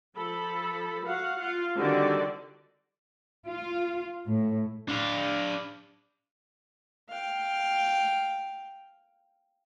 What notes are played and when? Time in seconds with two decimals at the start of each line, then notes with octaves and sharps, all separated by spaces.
0.16 F3 A4 B5
1.06 F#4 F5 F#5
1.39 F4 F5
1.76 D3 D#3 G3 C4 F#4 D5
3.46 F4
4.26 A2
4.89 D4 F5
7.09 F5 G5